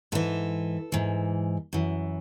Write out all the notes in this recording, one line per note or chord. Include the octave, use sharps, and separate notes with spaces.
G#2 E3 A4
G#2 E3
F#2 E3